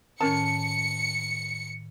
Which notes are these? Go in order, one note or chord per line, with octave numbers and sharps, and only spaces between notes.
A2 D#3 C#4 A#4 A5 C#7